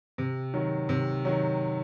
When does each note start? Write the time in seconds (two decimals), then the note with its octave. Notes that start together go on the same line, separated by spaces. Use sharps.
0.18 C3
0.54 D#3 F#3
0.89 C3
1.25 D#3 F#3